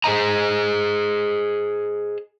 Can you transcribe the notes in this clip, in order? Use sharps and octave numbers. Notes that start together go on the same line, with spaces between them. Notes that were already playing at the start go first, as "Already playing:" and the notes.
G#4 C5 C#5 D#5 A#5